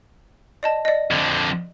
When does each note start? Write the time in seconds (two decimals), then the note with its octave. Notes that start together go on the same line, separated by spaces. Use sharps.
0.63 D5 D#5 A5
0.85 D5 D#5
1.11 F2 D3